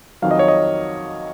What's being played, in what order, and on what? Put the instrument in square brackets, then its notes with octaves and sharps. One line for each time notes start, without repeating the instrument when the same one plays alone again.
[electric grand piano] F2 D#3 F#3 F5
D#5
C#5
D#5